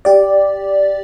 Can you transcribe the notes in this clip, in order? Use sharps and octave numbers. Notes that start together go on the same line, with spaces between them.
G4 D5